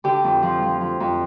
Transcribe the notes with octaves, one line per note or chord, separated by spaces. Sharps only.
D3 G4
F2
F3
F3
F3
F2